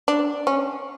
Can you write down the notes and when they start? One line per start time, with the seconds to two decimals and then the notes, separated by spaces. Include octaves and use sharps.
0.08 D4
0.47 C#4